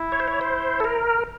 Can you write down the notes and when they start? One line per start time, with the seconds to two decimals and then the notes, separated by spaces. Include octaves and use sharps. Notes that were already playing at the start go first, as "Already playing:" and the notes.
Already playing: E4
0.12 C#5
0.20 C5
0.28 C#5
0.41 C5
0.80 A4
0.84 A#4